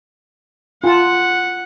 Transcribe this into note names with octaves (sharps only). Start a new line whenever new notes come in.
F4 F#5 A5